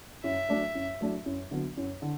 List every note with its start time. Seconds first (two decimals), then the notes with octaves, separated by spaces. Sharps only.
0.23 F#2 E5
0.49 F#3 A3 D4
0.75 F#2
1.01 F#3 A3 D4
1.26 F#2
1.51 D3 F#3 B3
1.77 F#2
2.02 D3